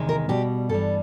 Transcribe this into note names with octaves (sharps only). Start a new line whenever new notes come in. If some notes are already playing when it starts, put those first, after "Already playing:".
Already playing: E2 C3 D#3 G#3
A#4
B2 G3 G4
G2 E3 G3 A4